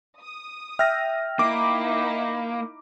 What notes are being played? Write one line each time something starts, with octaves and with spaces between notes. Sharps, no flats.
D#6
E5 G5 F6 A#6
A#3 D#4 E4 D6